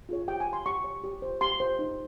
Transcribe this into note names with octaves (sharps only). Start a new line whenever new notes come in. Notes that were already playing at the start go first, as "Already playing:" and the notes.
F4 G#4 C#5
G4 G5
G#5
C#5
C6
G4 C#6
C#5
G4
C5
G4 C6
C5
D#4